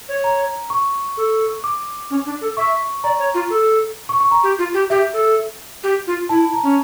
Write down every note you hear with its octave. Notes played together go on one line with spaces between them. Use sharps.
C#5
A#5
C#6
A4
D6
C#4
D4
A4
E5 C#6
D5 A#5
C#5
F4
A4
C#6
C#6
A#5
G4
F4
G4
G4 E5
A4
G4
F4
E4 A5
A#5
C#4